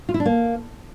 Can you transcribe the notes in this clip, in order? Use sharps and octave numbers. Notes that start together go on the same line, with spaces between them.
F4
E4
D4
A#3